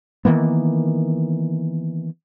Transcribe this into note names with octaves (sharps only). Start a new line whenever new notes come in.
D#3 E3 A#3 B3